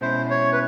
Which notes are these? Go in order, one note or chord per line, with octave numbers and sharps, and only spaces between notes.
B2 G#3 C#4 E4 C5
C#5
B4